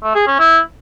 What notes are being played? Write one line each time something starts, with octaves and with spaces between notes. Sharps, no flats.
A3
G#4
C#4
E4